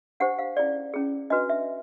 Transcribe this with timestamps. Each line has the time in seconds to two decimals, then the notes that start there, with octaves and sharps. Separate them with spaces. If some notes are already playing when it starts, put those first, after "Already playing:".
0.20 D4 G4 C5 F#5
0.39 F5
0.57 C#4 E4 G#4 D5
0.94 C#4 E4 G#4
1.30 D4 F#4 B4 D#5
1.50 E5